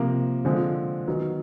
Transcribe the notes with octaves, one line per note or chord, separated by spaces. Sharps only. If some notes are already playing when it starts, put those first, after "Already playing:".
Already playing: C3 F3 A#3
D3 F3 G#3 C4
D#3 F#3 B3 D#4